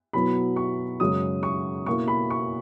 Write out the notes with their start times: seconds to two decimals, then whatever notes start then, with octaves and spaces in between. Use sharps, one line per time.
0.13 B2 F#3 B3 E4 B5
0.56 C#6
1.00 F#2 C#3 G#3 C#4 D#6
1.43 C#6
1.86 B2 A#3 E4 C#6
2.08 B5
2.30 C#6